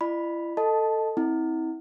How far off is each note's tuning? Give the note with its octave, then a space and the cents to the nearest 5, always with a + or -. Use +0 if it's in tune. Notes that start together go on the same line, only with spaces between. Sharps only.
E4 +40 D5 +45 B5 +0
A4 +15 D#5 +0 A5 -10
C4 +0 E4 -35